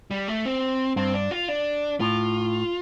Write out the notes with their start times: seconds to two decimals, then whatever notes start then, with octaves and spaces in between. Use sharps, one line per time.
0.11 G3
0.28 A3
0.45 C4
0.96 G2 C4
1.14 D4
1.31 F4
1.48 D4
2.00 A2 F4